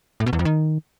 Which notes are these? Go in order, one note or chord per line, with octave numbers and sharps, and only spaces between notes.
A2
B2
E2
F2
D#3